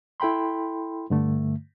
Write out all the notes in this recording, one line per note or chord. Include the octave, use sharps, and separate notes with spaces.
E4 A4 G5 B5 C6
G2 D3 A3